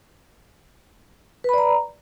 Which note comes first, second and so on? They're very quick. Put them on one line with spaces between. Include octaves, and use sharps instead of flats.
B4 B5 D5 A#5